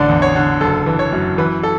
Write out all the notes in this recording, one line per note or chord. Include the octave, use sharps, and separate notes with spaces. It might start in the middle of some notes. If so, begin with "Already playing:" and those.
Already playing: A1 D3 D5
E2
C#5
D3
F#1 A4
E3
C#5
F#2
E3 B4
A4